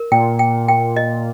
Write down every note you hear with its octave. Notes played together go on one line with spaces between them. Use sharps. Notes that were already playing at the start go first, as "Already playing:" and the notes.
Already playing: A#4
A#2 G5
G5
G5
D#5